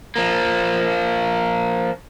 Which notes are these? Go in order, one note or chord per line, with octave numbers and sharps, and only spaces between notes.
F3 A#3